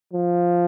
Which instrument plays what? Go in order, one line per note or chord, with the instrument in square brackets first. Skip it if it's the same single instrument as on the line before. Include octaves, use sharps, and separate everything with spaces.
[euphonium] F3